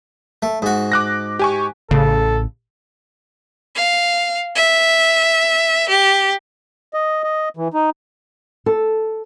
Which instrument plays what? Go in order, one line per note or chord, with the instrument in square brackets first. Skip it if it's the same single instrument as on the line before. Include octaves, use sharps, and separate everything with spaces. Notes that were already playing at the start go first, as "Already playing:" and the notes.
[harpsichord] A3
G#2 F#4
[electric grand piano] D6 F#6 A#6
G4 G#5 C#6
[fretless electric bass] A1 [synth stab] C#3 [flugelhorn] A4
[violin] F5
E5
G4
[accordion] D#5
D#5
E3
D#4
[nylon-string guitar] A4